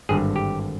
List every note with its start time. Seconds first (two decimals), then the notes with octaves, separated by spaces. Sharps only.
0.09 G#1 G2 D3 G#4
0.36 G4